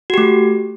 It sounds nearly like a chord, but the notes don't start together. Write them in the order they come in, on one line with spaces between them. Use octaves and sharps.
F#4 G4 A3